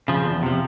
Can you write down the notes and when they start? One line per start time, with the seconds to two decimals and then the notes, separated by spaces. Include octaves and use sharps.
0.08 C#3 F3
0.25 E2
0.43 C3 F3